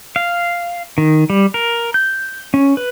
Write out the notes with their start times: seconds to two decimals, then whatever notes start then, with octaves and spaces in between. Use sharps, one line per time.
0.16 F5
0.98 D#3
1.30 G3
1.54 A#4
1.94 G6
2.54 C#4
2.77 B4